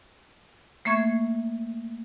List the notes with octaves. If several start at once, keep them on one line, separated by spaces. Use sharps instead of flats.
A3 A#3 E5 C#6 G#6